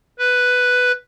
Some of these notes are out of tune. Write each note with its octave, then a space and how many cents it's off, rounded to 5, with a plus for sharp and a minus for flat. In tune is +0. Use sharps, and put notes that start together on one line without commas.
B4 +5